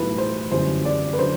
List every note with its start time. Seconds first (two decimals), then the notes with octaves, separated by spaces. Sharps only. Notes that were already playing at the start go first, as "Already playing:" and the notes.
Already playing: B1 A2 E3 G3 B4
0.18 C5
0.52 G1 F#2 E3 G3 C5
0.85 D5
1.13 B4
1.19 D3 F#3 C5